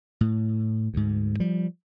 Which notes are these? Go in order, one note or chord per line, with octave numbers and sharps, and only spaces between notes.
A2
D2 G#2
F3 G3